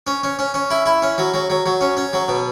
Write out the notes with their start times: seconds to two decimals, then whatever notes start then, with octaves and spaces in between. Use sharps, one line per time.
0.07 C#4
0.23 C#4
0.39 C#4
0.54 C#4
0.71 E4
0.86 E4
1.02 C#4
1.18 F#3
1.34 F#3
1.50 F#3
1.66 F#3
1.81 C#4
1.97 C#4
2.13 F#3
2.28 B2